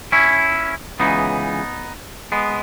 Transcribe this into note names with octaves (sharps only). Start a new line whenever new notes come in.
C#4 E4
C#2 C#3 E3 B3 D#4
G#3 B3